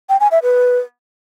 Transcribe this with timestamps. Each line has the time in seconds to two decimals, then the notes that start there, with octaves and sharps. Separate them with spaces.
0.09 G5
0.20 G#5
0.31 E5
0.42 B4